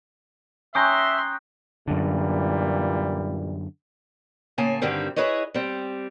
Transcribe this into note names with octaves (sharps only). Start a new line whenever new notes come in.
C#4 E5 G5 A#5 C6 D#6 F#6
F#2 A#2 D3 E3 G3
A2 C#3 A#3 G#5 A5
G2 D3 D#3 G3 C4
E4 G#4 B4 C#5 D#5
G3 C4